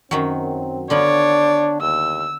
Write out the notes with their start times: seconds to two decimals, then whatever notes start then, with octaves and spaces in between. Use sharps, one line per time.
0.11 F#2 D#3 F#3 C4
0.90 D3 B3 D4 F4 C#5 D5
1.81 D#2 E6